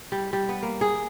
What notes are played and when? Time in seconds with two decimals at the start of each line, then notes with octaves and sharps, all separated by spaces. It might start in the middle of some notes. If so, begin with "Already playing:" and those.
0.12 G3
0.33 G3
0.49 B3
0.63 A#3
0.81 G#4